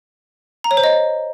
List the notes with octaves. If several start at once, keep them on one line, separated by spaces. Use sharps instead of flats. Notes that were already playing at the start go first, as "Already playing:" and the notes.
A#5
C#5
C5
D#5